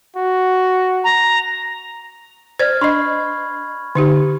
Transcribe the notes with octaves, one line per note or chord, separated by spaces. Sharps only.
F#4
A#5
C5 D5 F6 G#6
D4 D#5 B5 C#6
D3 D#4 G4